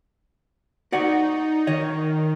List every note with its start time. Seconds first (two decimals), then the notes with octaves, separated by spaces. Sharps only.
0.92 D#4 F#4 D5 F#5
1.67 D#3 C#5 D#5